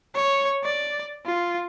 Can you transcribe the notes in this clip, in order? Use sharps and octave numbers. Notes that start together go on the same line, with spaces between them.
C#5
D5
F4